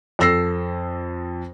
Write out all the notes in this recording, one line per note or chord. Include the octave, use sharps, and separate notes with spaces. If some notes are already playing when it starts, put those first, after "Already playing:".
F2 A4 E6 A#6 C7